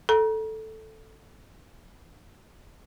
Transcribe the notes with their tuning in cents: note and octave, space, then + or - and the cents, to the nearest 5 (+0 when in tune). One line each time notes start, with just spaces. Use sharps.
A4 +0 A#5 +35